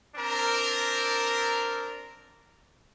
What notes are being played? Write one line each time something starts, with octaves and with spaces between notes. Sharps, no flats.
C4 D4 A#4